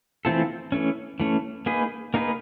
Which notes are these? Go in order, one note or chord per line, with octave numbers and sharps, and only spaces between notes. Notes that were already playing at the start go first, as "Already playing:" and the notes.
E3 A3 C4 F4 A4
E3 A3 C#4
E3 A3 C#4
A#3 D#4 G#4 B4
A#3 D#4 G#4 B4